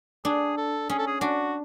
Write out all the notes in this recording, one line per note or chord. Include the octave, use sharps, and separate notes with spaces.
D4 G#4
A4
C#4 G#4
A4
G#4
D4 F#4